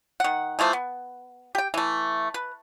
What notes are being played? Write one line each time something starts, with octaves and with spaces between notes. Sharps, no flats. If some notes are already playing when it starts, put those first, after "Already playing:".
D#3 F#5
E3 F3 A3 C5
B3
G4 G5
E3 A3
B4